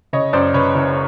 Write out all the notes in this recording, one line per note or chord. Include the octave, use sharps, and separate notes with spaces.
C#3 C#5 D#5
F#2 C5 D5
C#3 B4 C#5
F#1